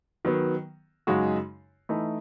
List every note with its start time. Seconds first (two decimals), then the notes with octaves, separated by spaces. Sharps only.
0.25 D#3 F#3 B3
1.07 F#2 C#3 G#3 D#4 F#4
1.89 E3 A3 D#4